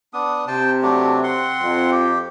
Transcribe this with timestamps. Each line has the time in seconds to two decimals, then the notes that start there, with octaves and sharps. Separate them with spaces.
0.13 B3 D4 D#6
0.48 C3 C5 G5 A5
0.82 F#3 A3 D4
1.24 C4 F#5 C6
1.63 F2
1.91 G4